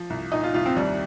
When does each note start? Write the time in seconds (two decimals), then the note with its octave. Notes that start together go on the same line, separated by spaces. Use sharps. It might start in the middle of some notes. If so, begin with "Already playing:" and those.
Already playing: F3
0.10 C2
0.32 A#2 D#4
0.43 F4
0.54 C2 F4
0.66 C4
0.76 D#2 G3